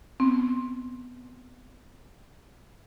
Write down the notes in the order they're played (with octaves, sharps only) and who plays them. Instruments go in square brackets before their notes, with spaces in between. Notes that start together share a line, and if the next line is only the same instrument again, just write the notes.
[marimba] B3 C4